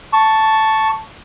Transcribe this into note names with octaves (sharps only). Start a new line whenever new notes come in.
A5 C#6